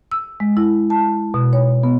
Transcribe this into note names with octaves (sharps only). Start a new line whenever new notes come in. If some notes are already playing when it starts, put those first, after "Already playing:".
E6
G#3
E4
A5
B2
C#5
B3